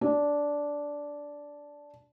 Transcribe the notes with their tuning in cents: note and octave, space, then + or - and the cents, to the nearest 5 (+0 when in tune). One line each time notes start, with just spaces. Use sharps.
D4 -10